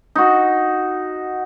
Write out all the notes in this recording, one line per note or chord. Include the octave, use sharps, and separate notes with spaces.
D#4 F#4